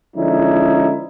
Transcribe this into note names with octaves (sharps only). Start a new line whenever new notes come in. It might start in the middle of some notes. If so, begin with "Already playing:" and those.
D3 F3 G#3 C#4 D#4 E4